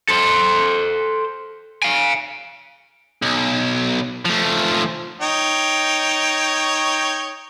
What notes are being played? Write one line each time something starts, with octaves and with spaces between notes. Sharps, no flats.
A4 C5
F5 G#5
B1
F3 A3
D#4 C#5 G5